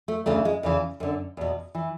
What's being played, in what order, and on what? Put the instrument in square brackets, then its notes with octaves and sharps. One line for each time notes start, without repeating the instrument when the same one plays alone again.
[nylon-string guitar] A3
D2 C#3 E3 A3
G#3
E2 C#3 E3
F#2 D3
E2 B2
E3